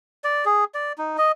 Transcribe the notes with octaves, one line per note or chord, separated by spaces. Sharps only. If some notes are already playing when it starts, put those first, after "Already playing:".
D5
G#4
D5
D#4
D#5